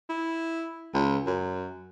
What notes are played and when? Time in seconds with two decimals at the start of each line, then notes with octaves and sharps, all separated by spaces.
0.10 E4
0.94 C#2
1.27 F#2